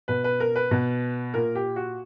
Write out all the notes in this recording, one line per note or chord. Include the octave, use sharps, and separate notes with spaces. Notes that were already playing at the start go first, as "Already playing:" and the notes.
B2 B4
B4
A#4
B4
B2
A#2 A#4
G4
F#4